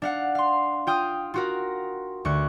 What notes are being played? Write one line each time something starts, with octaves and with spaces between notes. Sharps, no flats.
D4 F5 F#5
F5 C6
F4 G5 D#6 F6
F4 F#4 A#4
D2 C#6 F#6